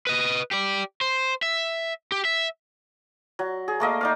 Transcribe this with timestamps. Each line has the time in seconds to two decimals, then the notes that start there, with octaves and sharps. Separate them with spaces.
0.07 B4 D#5
0.51 G4 D5
1.01 C5
1.42 E5
2.12 G4
2.25 E5
3.39 F#3
3.68 G#4
3.80 A3 A#3 D#5 F5
4.01 D#4 D5 F5